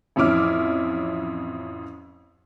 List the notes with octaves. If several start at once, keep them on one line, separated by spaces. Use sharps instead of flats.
A1 F2 C#4 E4 D6 F6